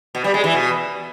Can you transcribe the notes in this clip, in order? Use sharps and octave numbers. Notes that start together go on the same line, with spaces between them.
B2
G3
G#3
E3
B2